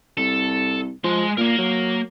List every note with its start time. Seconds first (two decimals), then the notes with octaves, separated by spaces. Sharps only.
0.17 C2 A4
1.04 F3 G#3 C6
1.38 A#2 A#3 A#4
1.58 F#3